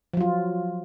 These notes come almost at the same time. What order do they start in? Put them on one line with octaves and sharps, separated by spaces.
F3 F#3 F4